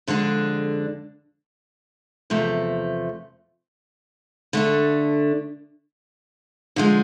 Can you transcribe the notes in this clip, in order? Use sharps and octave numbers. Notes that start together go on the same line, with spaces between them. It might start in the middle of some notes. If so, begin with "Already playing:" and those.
F2 D3 G#3 D4
E2 C3 F3 A3
D3 A3 D4
D3 F3 G#3